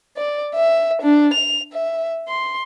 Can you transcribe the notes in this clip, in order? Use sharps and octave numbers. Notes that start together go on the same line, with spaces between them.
D5
E5
D4
F7
E5
C6